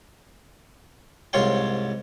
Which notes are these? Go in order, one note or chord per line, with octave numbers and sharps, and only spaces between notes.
C2 G#2 F4 C#5 F5 G5